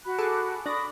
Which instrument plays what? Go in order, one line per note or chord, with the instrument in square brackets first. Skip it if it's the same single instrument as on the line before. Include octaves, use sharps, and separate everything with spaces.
[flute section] F#4 B5 F#6
[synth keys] G#4 A4 D6
[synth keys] D4 A#6 [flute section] B5 C#6 D#6